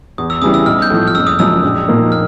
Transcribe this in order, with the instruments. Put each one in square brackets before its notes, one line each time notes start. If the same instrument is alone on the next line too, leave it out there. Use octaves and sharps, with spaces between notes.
[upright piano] E2 [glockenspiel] D#6
[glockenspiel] E6
[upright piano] C#3 E3 G3 [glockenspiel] D#6
[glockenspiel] E6
[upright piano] B1 [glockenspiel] F6
[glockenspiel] G6
[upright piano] A2 F3
[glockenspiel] F6
[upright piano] F#1 [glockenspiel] E6
[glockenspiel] D#6
[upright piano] F#2 C#3 F3 G#3 [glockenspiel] E6
[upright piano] A#1
A#2 F3 A#3 D#4
[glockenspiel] F6